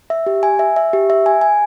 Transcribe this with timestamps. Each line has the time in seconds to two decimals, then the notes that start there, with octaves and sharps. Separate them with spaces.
0.10 E5
0.26 G4
0.43 G#5
0.59 E5
0.76 E5
0.93 G4
1.10 E5
1.26 G#5
1.41 G#5